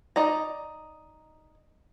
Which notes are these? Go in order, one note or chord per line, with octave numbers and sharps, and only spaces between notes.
D#4 D5 A#5